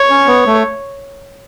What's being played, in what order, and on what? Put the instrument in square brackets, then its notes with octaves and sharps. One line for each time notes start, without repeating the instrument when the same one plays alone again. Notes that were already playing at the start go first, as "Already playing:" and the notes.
Already playing: [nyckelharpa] C#5
[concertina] C#4
B3
A3